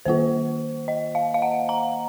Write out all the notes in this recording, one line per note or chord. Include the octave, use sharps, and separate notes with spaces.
D#3 A#3 F4 C5
D#5
F5
F5
F#5
A#5